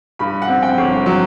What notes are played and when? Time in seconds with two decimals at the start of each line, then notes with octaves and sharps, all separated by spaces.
0.19 G2 B5
0.42 F#5
0.48 C4
0.62 G5
0.78 G1
1.06 F#3